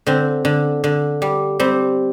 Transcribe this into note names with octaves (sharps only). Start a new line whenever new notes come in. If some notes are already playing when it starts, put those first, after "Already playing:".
D3 C4
D3
D3
G3
G3 C4